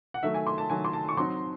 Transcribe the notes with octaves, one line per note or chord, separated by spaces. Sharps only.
F#5
D#3 F#3 A3 E5
G#5
C6
A5
D#3 F#3 A3 G#5
C6
A5
C#6
F#3 C4 D#4 C6